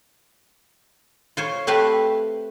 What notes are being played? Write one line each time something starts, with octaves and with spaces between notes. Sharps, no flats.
F4 C5 C#5
A3 C4 G4 B4 E5 F5